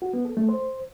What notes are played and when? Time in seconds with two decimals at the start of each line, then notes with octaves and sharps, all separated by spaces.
0.02 F#4
0.14 B3
0.25 A4
0.37 A3
0.49 C5